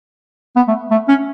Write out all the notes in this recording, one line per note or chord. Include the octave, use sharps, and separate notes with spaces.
B3
A3
A3
C#4